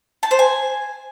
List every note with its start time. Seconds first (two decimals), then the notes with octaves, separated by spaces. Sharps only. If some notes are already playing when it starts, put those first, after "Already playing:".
0.23 A5
0.31 C5
0.39 G#5